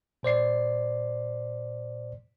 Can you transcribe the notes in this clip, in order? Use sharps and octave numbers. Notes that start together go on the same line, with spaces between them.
A#2 C5 D5 C7